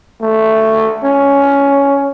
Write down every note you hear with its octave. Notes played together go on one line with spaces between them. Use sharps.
A3
C#4